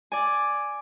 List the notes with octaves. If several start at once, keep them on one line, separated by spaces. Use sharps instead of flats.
D5 G#5